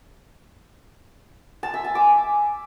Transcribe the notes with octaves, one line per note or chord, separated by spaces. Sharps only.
A5
E5
G#5
D6